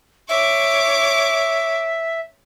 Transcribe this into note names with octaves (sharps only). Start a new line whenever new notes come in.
C#5 E5 D6